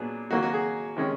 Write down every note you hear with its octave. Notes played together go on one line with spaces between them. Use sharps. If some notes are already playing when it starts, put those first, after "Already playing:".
Already playing: A#2 F#3 B3 D4 G#4
D#3 F#3 A#3 F#4
F#4
G#4
C3 D#3 G#3 C#4